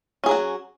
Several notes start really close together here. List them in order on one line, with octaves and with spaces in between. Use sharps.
C#4 G#4 F#3 F#4